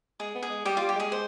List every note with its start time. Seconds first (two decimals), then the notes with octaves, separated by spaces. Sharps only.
0.20 G#3 G#4
0.35 B3
0.43 G#4
0.50 G#3
0.65 G3 G4
0.77 G3 F4
0.89 G4
0.96 G#3 G#4
1.12 C5